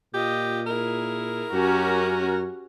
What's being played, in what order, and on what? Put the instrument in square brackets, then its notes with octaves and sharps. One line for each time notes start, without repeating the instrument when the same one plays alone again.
[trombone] A#2 [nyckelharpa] F4 D#5 [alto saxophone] G4
[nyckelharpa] E4 G#4 [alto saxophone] A#4
[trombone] F#2 [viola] C#4 F#4 [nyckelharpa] G4 A#5